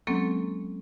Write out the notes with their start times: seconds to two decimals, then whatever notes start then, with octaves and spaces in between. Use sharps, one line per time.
0.07 F#3 G#3 A#3 C4 C#4 A4